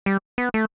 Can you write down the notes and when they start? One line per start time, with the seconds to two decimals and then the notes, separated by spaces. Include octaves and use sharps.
0.06 G3
0.38 B3
0.54 A3